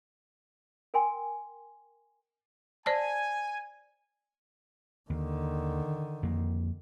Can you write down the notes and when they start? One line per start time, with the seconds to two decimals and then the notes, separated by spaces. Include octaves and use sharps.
0.94 A#4 G5 G#5 C6
2.86 C5 D5 G#5 A5
5.10 D#2 D3 D#3
6.23 F2 A#3